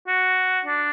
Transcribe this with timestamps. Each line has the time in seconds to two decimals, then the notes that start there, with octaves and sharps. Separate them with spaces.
0.07 F#4
0.65 D4